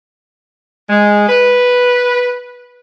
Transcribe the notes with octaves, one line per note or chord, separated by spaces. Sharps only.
G#3
B4